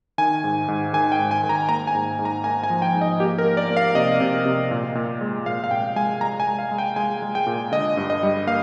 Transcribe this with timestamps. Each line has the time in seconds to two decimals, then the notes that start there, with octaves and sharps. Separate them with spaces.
0.18 D#3 G#5
0.44 G#2
0.68 G#2
0.93 D#3 G#5
1.12 G5
1.19 G#2
1.31 G#5
1.43 D#3
1.49 A#5
1.69 A#3 A#5
1.87 G#5
1.95 G#2
2.19 G#2
2.25 A#5
2.44 A#3 G#5
2.63 G#5
2.70 F3
2.82 G5
2.94 G#2
3.01 D#5
3.20 A#3 G4
3.38 A#4
3.44 A#3
3.57 D5
3.70 A#3
3.77 F5
3.95 C3 D#5
4.20 C3
4.46 C3
4.71 A#2
4.95 A#2
5.21 G#3
5.46 A#2 F5
5.64 F5
5.71 A#2 G5
5.96 G#3 G#5
6.21 G#3 A#5
6.40 G#5
6.47 G#3
6.59 F5
6.71 G#3
6.78 G5
6.96 G#3 G#5
7.22 G#3
7.35 G5
7.47 A#2
7.72 D3 D#5
7.97 G2
8.10 D#5
8.23 G3
8.47 A#3 F5